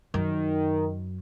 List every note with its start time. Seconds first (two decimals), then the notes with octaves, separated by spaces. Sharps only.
0.14 F#2 D#3